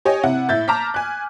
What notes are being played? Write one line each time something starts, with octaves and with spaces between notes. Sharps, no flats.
G4 C#5 D#5 G#5
C3 E4 F#5
A2 E5 G6 A6
A5 A#5 D6 F6 B6
G#5 F#6